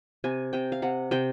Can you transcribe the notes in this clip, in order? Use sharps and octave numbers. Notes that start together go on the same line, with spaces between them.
C3 G#5
C3 G5
F5
C3 F#5
C3 G5